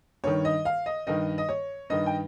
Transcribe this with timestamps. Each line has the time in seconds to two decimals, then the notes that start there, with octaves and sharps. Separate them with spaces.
0.24 G2 D#3 C#5
0.45 D#5
0.65 F5
0.86 D#5
1.07 G2 D#3 D#5
1.38 D#5
1.49 C#5
1.90 G2 D#3 D#5
2.06 G5